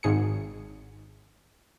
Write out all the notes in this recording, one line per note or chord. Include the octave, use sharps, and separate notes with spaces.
G#1 G#2 G#4 C#7